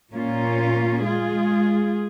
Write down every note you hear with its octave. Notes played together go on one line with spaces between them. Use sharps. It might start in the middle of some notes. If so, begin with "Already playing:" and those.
A#2 A#3 C#4 F4
G#3 F4 G#4